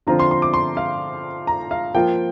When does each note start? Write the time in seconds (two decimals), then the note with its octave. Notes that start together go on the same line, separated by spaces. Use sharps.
0.07 D3 F3 C4 F4 A#5
0.19 C6
0.31 C6
0.42 D6
0.54 C6
0.77 F5
1.47 A#5
1.71 F5
1.94 F3 A#3 F4 G5